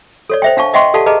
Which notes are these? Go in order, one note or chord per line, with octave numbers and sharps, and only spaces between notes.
A4 C#5 D5
C5 E5 G5
D4 F5 A5 C#6
D#5 E5 F#5 G5 C6 C#6
G4 A4 D5 F5 F#5 A5
G#4 B4 D#5 A5 A#5